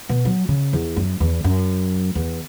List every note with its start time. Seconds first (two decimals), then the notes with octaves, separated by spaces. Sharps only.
0.09 B2
0.25 F#3
0.48 C#3
0.73 E2
0.97 F#2
1.20 E2
1.44 F#2
2.15 E2